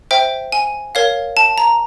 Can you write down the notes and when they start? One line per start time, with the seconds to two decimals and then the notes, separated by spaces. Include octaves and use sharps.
0.11 C5 E5 G5
0.52 G#5
0.95 A#4 C#5 F5
1.37 A5
1.58 A#5